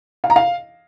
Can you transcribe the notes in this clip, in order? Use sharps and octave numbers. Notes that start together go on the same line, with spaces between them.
F5
A#5
F5